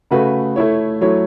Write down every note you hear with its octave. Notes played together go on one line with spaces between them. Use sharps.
C#3 A3 F#4 B4
A3 E4 C#5
F#3 A3 E4 C#5